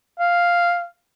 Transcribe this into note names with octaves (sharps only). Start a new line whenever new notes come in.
F5